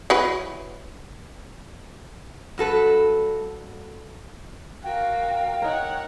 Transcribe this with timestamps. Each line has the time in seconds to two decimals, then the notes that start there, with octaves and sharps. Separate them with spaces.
0.10 F#3 E4 B4
2.58 G2 F#4 A4 B4
4.83 F#4 A#4 F5 G5
5.62 D#4 A#4 C#5 F#5